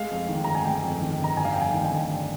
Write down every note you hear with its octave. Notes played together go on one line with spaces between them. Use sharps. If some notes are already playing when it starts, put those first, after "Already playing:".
Already playing: G#3 F5
F2
D#3
G1 A#5
G#5
G#3 G5
F2
D#3
G1 A#5
G3 G#5
F5
F2 G5
G#5
D#3
G#5
G1
G3